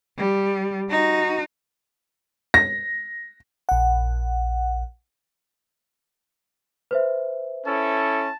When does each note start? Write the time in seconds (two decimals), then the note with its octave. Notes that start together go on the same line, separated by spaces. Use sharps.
0.18 G3
0.90 D#4 F#4
2.54 A#6
3.69 A#1 F#5
6.91 B4 C5 E5
7.67 C#4 E4 A4 A5